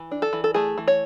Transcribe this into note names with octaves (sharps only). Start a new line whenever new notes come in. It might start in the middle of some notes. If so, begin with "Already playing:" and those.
Already playing: E3
D4
A4
E3
A4
A3 G#4
E3
C#5